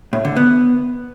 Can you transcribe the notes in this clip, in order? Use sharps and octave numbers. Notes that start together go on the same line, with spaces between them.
A2
D3
B3